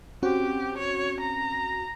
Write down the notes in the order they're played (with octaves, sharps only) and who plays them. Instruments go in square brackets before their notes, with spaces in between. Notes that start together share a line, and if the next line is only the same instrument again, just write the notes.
[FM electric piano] C4 C#4 F#4 [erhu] G4
[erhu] C#5
A#5